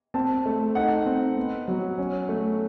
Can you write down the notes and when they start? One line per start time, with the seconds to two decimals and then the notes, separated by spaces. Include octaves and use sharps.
0.14 C4 A5
0.46 A3
0.75 D#4 F#5
1.06 C4
1.37 B3
1.68 F#3
1.98 C#4
2.29 A3